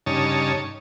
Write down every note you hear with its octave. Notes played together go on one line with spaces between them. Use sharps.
G2 C#3 D#4 C#5 A5